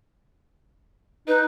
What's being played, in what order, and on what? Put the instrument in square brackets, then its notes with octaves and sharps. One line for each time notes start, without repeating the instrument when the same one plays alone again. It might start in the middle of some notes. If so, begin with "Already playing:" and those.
[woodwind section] D#4 [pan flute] B4